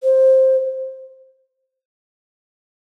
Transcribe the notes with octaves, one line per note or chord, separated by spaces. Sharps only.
C5